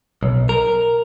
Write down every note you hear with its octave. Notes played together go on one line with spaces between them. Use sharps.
B1
A#4